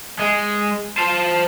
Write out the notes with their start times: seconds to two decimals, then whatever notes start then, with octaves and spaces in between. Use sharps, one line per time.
0.19 G#3
0.98 C5 A5